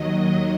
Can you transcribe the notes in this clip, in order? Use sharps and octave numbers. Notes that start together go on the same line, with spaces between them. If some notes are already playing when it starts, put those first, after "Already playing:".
Already playing: D#2 D#3 F#3 D#5